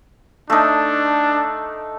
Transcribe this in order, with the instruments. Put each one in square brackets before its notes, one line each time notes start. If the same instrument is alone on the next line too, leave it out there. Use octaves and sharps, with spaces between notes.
[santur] A3 D#4 [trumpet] D4